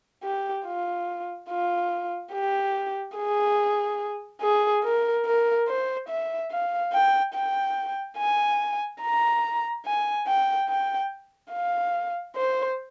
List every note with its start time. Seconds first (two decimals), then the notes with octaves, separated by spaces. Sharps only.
0.23 G4
0.65 F4
1.50 F4
2.33 G4
3.17 G#4
4.41 G#4
4.84 A#4
5.26 A#4
5.67 C5
6.09 E5
6.51 F5
6.93 G5
7.34 G5
8.18 G#5
9.01 A#5
9.85 G#5
10.27 G5
10.69 G5
11.52 F5
12.36 C5